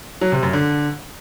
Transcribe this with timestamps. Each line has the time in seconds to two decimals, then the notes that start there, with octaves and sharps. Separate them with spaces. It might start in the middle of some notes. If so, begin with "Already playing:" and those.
0.21 F#3
0.32 C3
0.43 F#2
0.53 D3